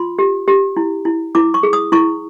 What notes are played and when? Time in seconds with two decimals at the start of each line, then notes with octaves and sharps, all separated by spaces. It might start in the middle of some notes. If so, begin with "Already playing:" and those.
Already playing: F4 C6
0.19 G4
0.48 G4
0.77 E4
1.05 E4
1.35 E4 D6
1.54 C#6
1.63 G#4
1.73 D#6
1.92 E4 C#6